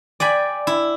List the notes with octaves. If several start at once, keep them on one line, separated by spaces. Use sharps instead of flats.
D5 G5 G#5 B5
E4